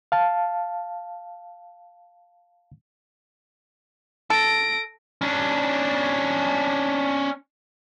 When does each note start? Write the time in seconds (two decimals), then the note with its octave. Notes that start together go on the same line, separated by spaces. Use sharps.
0.12 F5 A5
4.30 A4 A#6 D7
5.22 C#4 D4